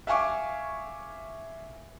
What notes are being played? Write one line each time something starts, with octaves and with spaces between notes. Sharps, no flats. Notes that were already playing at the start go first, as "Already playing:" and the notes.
E5 F5 G#5 C#6 D6